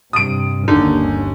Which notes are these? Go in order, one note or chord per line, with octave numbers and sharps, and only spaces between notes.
G2 C3 D#6 D7
G1 D#2 D3 C#4 D#4